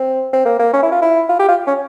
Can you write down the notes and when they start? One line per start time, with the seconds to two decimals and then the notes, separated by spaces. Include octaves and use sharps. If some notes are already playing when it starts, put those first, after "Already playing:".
Already playing: C4
0.33 C4
0.45 A#3
0.59 A#3
0.73 C#4
0.83 E4
0.92 F4
1.02 E4
1.29 F4
1.39 G4
1.48 F4
1.67 C#4